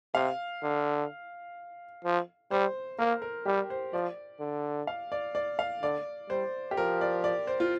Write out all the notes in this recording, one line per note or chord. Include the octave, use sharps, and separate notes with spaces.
C3 F5
D3
F3
G3 C5
A#3 A#4
A#4
G3 G4
C5
F3 D5
D3
F5
D5
D5
F5
D3 D5
G3 C5
G4
F3 A#4
D5
D5
C5
F4